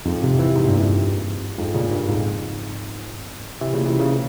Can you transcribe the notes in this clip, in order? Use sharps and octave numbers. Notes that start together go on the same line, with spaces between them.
F2 G#2
G#2 C3
C3 E3
G#2 C3
G2 A#2
F2 G#2
G2
F2 G#2
A#2 C#3
G2 A#2
F2 G#2
C3 E3
A#2 C#3
C3 E3
A#2 C#3
C3